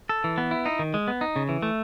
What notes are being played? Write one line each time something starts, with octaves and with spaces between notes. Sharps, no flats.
A4
E3
B3
E4
D#4
D#3
G#3
B3
D#4
C#3
E3
A3